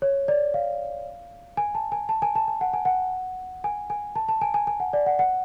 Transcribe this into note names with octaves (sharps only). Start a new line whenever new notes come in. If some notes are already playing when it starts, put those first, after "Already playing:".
C#5
D5
F5
G#5
A5
G#5
A5
G#5
A5
G#5
F#5
G#5
F#5
G#5
G#5
A5
A5
G#5
G#5
G#5
F#5
D5
F#5
F#5